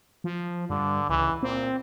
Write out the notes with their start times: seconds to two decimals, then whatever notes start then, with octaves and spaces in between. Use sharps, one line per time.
0.24 F3
0.70 G2 D3
1.10 C#2 E3
1.43 A#2 C4